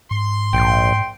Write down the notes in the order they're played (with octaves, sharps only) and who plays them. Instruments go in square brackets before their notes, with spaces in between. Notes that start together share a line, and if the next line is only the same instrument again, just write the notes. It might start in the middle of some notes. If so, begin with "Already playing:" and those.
[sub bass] G#2 [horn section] C6
[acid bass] A#1 [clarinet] G5